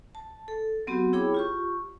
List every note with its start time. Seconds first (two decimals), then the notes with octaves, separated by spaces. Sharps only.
0.15 A5
0.48 A4
0.87 F#3 B3 C4 F#4 G4
1.13 E4 G#4 C#5 G5 B5 D6
1.34 F4 G4 C#6